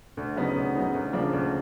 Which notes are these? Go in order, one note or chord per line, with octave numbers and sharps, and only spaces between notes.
D2
C#3 F#3 B3 D#4
D2
C#3 F#3 B3 D#4
D2
C#3 F3 A#3 D4
D2